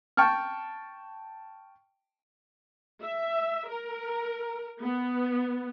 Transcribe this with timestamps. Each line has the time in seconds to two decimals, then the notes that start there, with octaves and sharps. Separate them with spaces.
0.17 G5 A5 C#6 F6
3.03 E5
3.70 A#4
4.83 B3